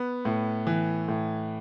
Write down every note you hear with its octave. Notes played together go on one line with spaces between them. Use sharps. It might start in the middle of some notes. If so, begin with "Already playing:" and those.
Already playing: B3
A2
E3
A2